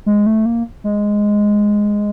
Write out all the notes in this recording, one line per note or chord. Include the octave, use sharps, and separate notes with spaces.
G#3
A3
A#3
G#3